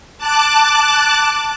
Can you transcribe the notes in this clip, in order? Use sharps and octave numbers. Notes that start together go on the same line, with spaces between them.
A5 D6 F#6